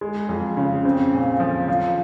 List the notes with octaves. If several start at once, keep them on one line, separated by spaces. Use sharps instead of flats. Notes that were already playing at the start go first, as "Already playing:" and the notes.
G#3
F2
C#3
C4
A#2
F3
F3